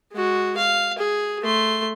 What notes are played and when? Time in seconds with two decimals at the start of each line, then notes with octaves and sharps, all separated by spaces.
0.12 G#3 F#4
0.57 F5
0.98 G#4
1.42 A3 C6